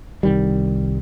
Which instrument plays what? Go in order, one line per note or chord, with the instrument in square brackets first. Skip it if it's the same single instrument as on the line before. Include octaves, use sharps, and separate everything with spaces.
[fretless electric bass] C2 D#3 G3